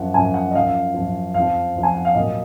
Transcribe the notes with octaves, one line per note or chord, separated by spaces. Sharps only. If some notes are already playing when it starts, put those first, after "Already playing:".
Already playing: F#2 F3 F#5
F#2 F3 G#5
F#5
D#5
F#2 F3 F5
F#2 F3
F2 F5
F3
F2 F3
G#5
F#5
F5
A#2 F#3 D#5